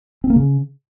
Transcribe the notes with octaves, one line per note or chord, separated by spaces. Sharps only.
C4
A#3
C#3